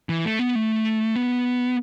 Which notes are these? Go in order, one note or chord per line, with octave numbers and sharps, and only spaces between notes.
E3
A3
B3
A3
B3